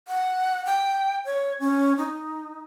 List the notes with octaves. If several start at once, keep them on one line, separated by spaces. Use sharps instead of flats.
F#5
G5
C#5
C#4
D#4